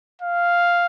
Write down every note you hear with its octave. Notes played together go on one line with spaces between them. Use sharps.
F5